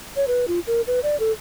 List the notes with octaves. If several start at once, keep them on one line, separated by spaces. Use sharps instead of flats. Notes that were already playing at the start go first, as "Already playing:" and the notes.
C#5
B4
F4
A#4
B4
D5
A4